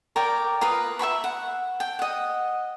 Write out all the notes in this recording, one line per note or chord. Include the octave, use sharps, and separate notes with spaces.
A#4 C#5 D5 G5
F4 A#4 B4 D#6
E5 G5 B5 C#6
F#5
G5
D#5 F#5